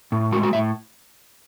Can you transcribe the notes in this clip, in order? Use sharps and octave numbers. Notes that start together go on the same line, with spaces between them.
A2
G#3 F#4
F#4
A2 E5